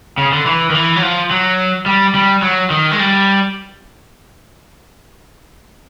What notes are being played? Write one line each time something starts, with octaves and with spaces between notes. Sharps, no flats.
C#3
D3
E3
D#3
E3
F#3
F3
F#3
G3
G3
F#3
D#3
G#3
G3